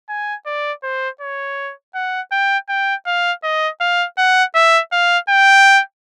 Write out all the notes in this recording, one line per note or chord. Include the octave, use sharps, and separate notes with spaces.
G#5
D5
C5
C#5
F#5
G5
G5
F5
D#5
F5
F#5
E5
F5
G5